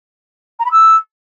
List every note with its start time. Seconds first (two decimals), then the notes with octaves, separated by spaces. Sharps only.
0.59 A#5
0.65 B5
0.71 E6